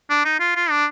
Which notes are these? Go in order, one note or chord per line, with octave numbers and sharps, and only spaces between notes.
D4
D#4
F4
F4
D4